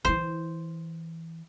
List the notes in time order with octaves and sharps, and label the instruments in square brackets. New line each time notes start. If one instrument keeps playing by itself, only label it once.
[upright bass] E3 E4 [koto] C5